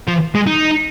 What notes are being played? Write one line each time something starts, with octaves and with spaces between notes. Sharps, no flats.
F3
G#3
D#4